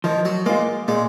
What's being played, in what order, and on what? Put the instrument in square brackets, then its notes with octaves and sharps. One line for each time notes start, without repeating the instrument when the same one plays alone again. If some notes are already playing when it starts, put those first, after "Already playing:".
[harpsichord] D#3 [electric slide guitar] F3
[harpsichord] F#3
[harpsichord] G#3 [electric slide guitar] A#3 F4
[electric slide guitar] A#2 [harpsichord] G#3